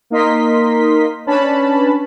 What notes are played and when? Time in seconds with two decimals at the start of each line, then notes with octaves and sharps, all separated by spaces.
0.10 A#3 D#4 A#4 D#5 C6 B6
1.26 C#4 D4 B4 A5 B5